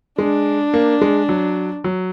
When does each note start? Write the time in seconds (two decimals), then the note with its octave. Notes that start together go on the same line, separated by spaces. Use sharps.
0.18 G#3 D4
0.74 A#3
1.01 G#3
1.29 F#3
1.84 F#3